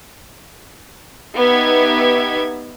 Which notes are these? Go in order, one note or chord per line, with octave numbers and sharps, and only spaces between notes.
B3 D#4 G4 E5 G#6